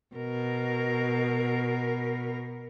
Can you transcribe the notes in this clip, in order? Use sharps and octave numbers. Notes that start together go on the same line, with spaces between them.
B2 A#4